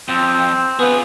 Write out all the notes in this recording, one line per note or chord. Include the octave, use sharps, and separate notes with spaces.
F2 C4
B3 F4 G#4